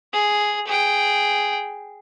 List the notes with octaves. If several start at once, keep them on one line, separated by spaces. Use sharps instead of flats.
G#4
G#4 G5